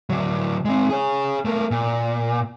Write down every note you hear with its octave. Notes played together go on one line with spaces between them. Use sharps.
D3 F#3
G#3 C4
G#4 C#5
A3 A#3
A#2